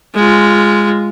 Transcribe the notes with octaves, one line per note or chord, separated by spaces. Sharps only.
G#3 F4